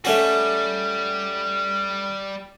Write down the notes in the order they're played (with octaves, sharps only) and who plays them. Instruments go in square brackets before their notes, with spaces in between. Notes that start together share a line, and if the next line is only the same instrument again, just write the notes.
[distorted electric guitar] G3 [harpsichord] A3 C#4 F#4